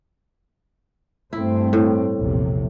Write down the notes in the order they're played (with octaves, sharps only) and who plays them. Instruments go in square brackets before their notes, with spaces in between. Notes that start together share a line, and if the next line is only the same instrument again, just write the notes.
[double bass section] G2 A3 C4 [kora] E4
[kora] A2
[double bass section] A#1 E2 C3